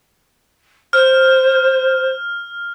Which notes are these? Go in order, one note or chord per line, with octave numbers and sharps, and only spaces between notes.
C5 F6